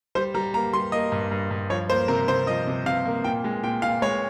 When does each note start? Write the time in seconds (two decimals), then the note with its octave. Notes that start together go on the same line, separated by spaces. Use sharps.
0.15 G3 C5
0.34 G3 A#5
0.54 A#3 A#5
0.73 G3 C6
0.92 A#3 D#5
1.12 G2
1.31 G2
1.51 G2
1.70 F3 C#5
1.89 A#3 C5
2.08 C3 A#4
2.28 C3 C5
2.47 F3 D#5
2.67 C3
2.86 C3 F5
3.05 A#3
3.24 A#2 G5
3.44 G#3
3.63 A#2 G5
3.82 A#2 F5
4.02 G#3 C#5